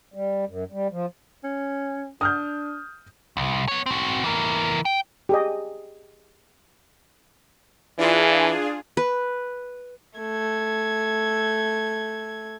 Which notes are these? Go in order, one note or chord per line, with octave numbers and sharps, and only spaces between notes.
G3
F#2
G3
F3
C#4
D4 D#6 F6 G6
C2
B3 C#5
C4 F#4
E3 A#4
G5
G4 G#4 D#5
E3 D4 F4 G#4
B4
A3 G#6